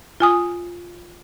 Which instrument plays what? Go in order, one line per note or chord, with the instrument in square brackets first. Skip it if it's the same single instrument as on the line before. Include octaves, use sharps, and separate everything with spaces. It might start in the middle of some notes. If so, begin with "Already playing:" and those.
[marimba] F4 G#5 D#6